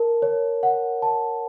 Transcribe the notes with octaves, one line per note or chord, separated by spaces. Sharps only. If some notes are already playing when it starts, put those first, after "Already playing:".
Already playing: A#4 A5
C#5
F#5
A5